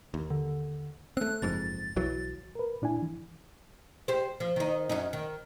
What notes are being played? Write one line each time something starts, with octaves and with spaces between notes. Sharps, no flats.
D#2
D3
A3 C4 F#6
F#1 F2 G#2 A6
B1 E3 F#3
A#4 B4
A#2 D4 E4 G#5
E3
G4 C5
F3
D#3 D#4
F#2 C#4 D#4
D#3